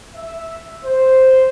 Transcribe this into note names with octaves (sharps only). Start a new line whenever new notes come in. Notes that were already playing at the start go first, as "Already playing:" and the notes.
E5
C5